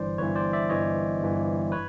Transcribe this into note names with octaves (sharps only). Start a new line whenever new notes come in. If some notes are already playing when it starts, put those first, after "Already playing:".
Already playing: G1 G2 E3 C5 D5
G1 G2 E3 B4 C#5
C5 D5
D5 E5
G1 G2 E3 C#5 D#5
G1 G2 E3
B4 C#5